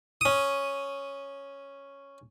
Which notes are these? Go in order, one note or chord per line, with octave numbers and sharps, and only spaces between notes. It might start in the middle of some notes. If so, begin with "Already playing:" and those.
C#4 D#6